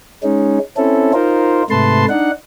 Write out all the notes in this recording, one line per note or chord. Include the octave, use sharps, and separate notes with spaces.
G#3 C#4 D#4
C4 C#4 E4 A4
D#4 F4 A#4 C5
G#2 C3 A3 B4 A5 C6
D4 D#4 F#5